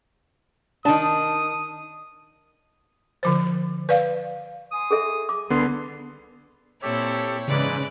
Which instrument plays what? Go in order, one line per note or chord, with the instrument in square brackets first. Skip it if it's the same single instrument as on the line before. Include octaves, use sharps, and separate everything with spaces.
[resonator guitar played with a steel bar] D#3 A5 [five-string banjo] D4 D#4 [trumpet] D#6
[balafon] D3 F3 C5
B4 D5 F5
[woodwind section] G#5 C6 D#6
[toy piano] G#4 A4 E5
D6
[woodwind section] C2 C6 [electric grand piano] D3 B3
[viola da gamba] A#2 C4 E4 [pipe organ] G4 A4 [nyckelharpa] C#5
[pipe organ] G#2 E3 [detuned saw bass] C#3 [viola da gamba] G#3 B4 D5